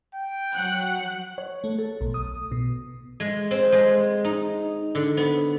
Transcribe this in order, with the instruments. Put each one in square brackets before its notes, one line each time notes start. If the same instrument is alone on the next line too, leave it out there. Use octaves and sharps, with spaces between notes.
[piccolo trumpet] G5
[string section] F#3 F#5 F#6
[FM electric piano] C#5
A3
A4
B1
D#6
B2
[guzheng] G#3
C4
G#3
D#4
D3
B3